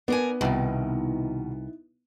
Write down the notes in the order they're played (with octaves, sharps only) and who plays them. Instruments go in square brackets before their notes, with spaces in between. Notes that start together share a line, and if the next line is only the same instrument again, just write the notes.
[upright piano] B3 [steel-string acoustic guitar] D4 A#4 G#5
[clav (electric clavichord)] C2 [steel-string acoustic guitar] B2 D#3 [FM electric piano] D#4 E4